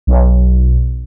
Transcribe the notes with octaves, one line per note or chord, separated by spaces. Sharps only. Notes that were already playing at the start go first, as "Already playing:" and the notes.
B1